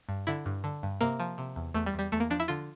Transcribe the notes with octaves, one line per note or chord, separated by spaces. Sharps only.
G2
D3 E4
G2
D3
G2
C3 A#3
F3
C3
E2
E2 A3
G3
E2
G3
E2 A3
A#3
F3 D4
E4
D3 F4